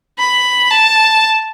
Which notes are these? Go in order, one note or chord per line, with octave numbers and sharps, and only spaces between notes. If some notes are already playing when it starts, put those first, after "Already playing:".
B5
A5